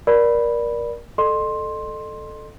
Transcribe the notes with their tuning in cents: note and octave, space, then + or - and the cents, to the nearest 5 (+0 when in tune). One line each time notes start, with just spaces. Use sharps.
A#4 +25 D5 +0 B5 +0
A4 +0 D#5 -40 C6 +10